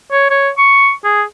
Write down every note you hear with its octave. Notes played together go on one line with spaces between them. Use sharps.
C#5
C#5
C#6
G#4